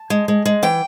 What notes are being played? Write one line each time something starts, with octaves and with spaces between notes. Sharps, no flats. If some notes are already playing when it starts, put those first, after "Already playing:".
Already playing: A5
G#3
G#3
G#3
E3 G5